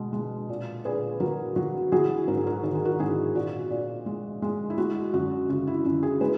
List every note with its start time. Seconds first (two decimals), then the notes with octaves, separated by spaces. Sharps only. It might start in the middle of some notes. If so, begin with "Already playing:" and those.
Already playing: B2 G#3
0.13 G#3
0.49 A#2
0.85 A#2 G#4 B4
1.20 F#3 F#4 A#4
1.56 F#3 F#4
1.92 F#3 E4 G#4
2.28 G#2 A#4
2.37 G#4
2.46 F#4 A#4
2.63 D#3 A#4
2.75 G#4
2.85 F#4 A#4
2.99 G#2 E4 G#4
3.35 A#2 F#4
3.70 A#2
4.06 G#3
4.42 G#3
4.70 E4
4.78 G#3 F#4
5.13 F#2 F#4
5.49 C#3 F#4
5.67 E4
5.85 F#2 F#4
6.03 E4 G#4
6.21 G#3 G#4 B4